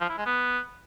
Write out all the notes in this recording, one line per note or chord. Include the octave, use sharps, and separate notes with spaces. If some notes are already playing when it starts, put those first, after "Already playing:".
F3
E4
G#3
B3